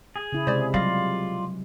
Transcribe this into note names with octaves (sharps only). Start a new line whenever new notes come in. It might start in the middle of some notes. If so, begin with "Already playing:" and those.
G#4
C#3 E4
C3 G#3 C5 D5
F#3 G3 F4 D5 F5 A#6